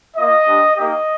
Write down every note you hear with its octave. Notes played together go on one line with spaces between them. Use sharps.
A#3 F4 D#5
G3 D4 G4
A#3 D#4 G4 D#5